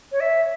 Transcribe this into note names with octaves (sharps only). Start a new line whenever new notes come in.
C#5
E5